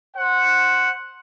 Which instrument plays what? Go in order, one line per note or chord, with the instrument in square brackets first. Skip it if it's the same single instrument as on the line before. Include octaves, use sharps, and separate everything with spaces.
[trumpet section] C5 F#5